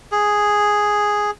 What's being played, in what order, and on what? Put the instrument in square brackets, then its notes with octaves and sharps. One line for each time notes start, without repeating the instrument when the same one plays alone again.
[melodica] G#4